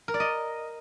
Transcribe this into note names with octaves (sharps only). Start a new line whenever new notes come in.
A#4
D5
D#5